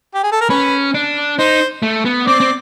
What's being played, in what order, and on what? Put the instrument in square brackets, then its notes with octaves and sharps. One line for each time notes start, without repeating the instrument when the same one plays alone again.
[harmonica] G4
G#4
A4
A#4
[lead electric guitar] C#4 [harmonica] B4
[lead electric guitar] D4
[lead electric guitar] D#4 [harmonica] C5
[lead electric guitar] A3
B3
[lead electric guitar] C4 [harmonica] D5
[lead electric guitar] C4